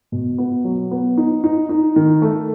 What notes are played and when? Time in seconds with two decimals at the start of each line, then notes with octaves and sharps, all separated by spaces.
0.12 B2
0.38 B3
0.64 F#3
0.91 B3
1.17 D#4
1.44 D#4
1.69 D#4
1.96 D#3
2.22 A3